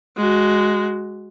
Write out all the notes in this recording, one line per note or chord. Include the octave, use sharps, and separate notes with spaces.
G#3 F#4